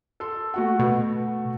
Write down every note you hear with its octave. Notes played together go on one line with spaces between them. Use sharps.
A4 C6
A3 F#4 F#5
B2